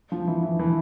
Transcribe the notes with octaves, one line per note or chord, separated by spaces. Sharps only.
F3
E3
E3
E3